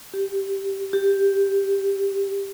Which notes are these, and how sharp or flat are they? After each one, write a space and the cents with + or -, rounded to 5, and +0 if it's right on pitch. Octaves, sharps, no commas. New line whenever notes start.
G4 -5
G4 +5